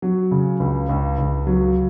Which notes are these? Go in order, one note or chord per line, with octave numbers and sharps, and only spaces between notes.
F#3
C#3
C#2
C#2
C#2
F#3